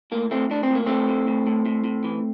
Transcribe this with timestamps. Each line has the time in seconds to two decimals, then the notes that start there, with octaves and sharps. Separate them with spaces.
0.12 A2 A#3
0.31 A2 A3 C4
0.51 A2 D4
0.63 C4
0.70 A2 A#3
0.86 A2 A3 C4
1.08 A2
1.27 A2
1.47 A2
1.66 A2
1.84 A2
2.04 E3